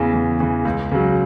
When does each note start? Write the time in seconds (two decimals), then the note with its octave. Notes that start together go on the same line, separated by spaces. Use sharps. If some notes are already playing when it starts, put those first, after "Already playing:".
Already playing: E2 C#3 E3
0.14 E2
0.40 C#3 E3
0.65 C#2
0.92 C#3 F#3